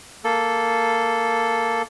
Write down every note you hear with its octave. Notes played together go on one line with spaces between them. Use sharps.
A#3 A4